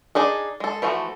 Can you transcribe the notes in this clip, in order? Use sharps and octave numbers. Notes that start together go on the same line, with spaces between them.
D4 D#4 G#4
G#3 A4
E3 F3 A3 F#4